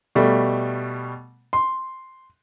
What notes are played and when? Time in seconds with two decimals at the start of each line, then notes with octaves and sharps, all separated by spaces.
0.15 B2 G3 A3
1.53 C6